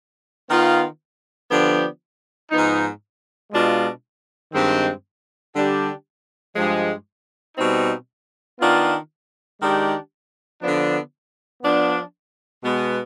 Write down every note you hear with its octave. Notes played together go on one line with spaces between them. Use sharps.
D#3 B3 F4
D3 F3 B3 D4 G4
G#2 F3 B3 D#4
B2 G#3 D4 F4
G2 D#3 G#3 C4
D3 G3 D4 G4
G2 F3 G#3
B2 G3 C4 D#4
D#3 B3 D4 F4
D#3 G#3 D4 G4
D3 F3 B3 D4
F3 B3 D4
B2 G#3 B3